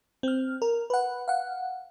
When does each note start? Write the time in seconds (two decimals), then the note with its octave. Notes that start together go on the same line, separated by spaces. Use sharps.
0.23 C4 F6
0.62 A#4
0.90 B4 F#5
1.28 F5 F#5